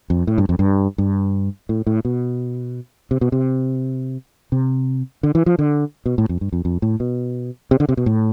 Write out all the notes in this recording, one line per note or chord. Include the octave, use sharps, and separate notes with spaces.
F2
A2
G2
F2
G2
G2
A2
A2
B2
C3
B2
C3
C3
D3
E3
F3
D3
B2
A2
F2
G2
F2
F2
A2
B2
C3
D3
C3
B2
A2